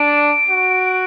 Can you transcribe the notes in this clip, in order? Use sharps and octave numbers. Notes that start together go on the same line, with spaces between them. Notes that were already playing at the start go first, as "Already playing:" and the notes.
Already playing: D4 D7
F#4